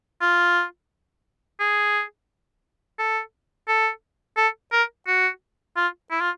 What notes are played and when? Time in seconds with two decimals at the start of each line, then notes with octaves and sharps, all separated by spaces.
0.21 F4
1.60 G#4
2.99 A4
3.68 A4
4.37 A4
4.72 A#4
5.07 F#4
5.77 F4
6.11 E4
6.20 F4